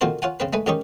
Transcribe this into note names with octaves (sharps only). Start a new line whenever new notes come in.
A#2 D#3 C4 F#4 A4 C5
F4 C#5 F#5 G#5
C#3 C4 B4
G#3 A3 B4 G#5
G#2 D#3 C#4 D#4 G4 C#6